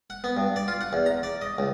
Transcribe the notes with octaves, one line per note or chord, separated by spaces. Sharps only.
F#5
B3
G2
D5
F4
F#5
E2
A#5
D5
D#5
C#2